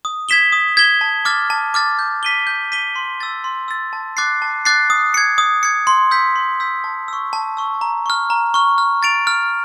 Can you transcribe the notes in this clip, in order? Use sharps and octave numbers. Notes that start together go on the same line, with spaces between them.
D#6
G#6 B6 E7 G7
D#6
G#6 B6 E7 G7
A5
D6 F6 A6
A5
D6 F6 A6
G6
B6 D#7 G7
G6
B6 D#7 G7
C6
E6 A6
C6
E6 A6
A5
D6 F#6 A6 C7
A5
D6 F#6 A6 C7
D#6
G#6 C#7
D#6
G#6 C#7
C6
E6 G6 B6
C6
E6 G6 B6
A5
C#6 E6
A5
C#6 E6
A#5
C#6 F6
A#5
C#6 F6
F6
A6 D7 F7
F6